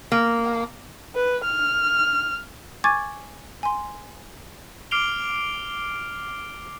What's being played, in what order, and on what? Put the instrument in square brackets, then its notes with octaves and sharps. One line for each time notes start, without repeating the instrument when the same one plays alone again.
[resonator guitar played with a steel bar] A#3
[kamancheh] B4
F6
[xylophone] G#5 C#6 D6 G#6 A6
G#5 C6
[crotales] D6 F6 C7 D7 F7 G7